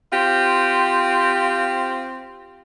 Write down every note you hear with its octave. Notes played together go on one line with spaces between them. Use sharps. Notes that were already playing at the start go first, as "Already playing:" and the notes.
C4 F4 G4